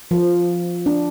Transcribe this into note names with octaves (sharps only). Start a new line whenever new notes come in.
F3
D4